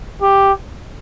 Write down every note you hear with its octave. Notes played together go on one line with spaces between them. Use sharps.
G4